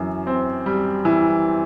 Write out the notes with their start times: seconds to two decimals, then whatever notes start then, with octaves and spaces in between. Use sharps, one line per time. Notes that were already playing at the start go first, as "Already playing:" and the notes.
Already playing: F#2 E3
0.27 C4
0.66 G3
1.05 E3